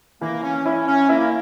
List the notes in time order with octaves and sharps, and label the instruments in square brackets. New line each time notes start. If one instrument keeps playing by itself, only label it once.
[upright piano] E3 [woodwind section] A#3
[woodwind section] C#4
[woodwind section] C#4 [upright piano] E4
[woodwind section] C#4
[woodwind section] A#3 [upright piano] E4